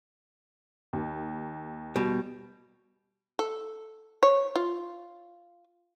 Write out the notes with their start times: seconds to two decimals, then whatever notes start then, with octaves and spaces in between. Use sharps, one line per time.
0.93 D#2
1.96 B2 G3
3.39 A4
4.23 C#5
4.56 F4